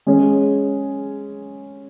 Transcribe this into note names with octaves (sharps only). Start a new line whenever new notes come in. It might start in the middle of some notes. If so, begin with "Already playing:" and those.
G#3 C#4 G#4